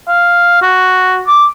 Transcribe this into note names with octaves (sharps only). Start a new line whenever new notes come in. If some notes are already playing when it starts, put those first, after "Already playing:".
F5
F#4
D6